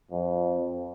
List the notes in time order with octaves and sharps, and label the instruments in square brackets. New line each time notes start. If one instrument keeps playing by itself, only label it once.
[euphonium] F2